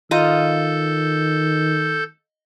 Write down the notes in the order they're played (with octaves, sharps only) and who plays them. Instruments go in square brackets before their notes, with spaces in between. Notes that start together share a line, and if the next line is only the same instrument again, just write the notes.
[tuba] D#3 [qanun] F4 D#5 A#5 [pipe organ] A4 G6